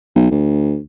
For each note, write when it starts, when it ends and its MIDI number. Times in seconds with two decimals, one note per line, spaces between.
0.16 0.28 35
0.31 0.79 38